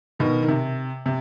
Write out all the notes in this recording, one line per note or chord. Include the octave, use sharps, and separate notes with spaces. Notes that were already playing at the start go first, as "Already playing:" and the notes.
B2 D#3
D#3
C3
C3